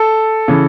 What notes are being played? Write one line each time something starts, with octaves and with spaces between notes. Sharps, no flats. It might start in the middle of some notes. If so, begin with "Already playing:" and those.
Already playing: A4
C#3 E3